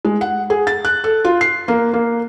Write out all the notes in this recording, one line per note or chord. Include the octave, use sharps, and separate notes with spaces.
G#3
F#5
G#4
A6
F#6
A4
F4
C7
A#3
A#3